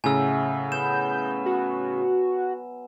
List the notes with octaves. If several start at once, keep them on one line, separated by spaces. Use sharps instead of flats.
A2 C#3 F#3 E5 G#5 E6
B3 B4 G6 E7
F#4